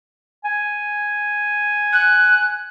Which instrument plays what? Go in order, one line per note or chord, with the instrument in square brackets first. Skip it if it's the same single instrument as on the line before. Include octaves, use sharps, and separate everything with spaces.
[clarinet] G#5
[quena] F#6